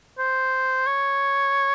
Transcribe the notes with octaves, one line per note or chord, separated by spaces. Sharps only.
C5
C#5